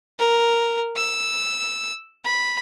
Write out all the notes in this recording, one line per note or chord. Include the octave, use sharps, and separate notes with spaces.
A#4
E6
B5